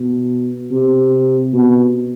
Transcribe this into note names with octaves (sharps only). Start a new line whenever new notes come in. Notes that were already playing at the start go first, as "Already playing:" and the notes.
Already playing: B2
C3
B2